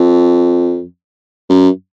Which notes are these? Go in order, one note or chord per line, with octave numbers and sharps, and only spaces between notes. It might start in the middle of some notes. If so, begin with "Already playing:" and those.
Already playing: F2
F#2